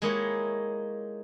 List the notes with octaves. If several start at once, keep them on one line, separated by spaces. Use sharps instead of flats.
G#3 A#3 D#4 E4 G4 C#5